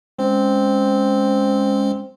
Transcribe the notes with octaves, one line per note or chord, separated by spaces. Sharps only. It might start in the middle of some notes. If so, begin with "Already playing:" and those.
G#3 C4 C#4